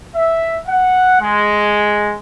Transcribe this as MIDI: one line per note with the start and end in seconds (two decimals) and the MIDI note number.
0.15 0.57 76
0.66 1.19 78
1.20 2.15 56